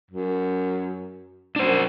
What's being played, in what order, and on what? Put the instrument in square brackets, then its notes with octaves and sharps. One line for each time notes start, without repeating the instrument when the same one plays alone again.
[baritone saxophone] F#2
[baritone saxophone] F#2 [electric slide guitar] D4 C5